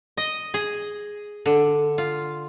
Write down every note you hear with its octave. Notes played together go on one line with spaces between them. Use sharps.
D#5
G#4
D3
F4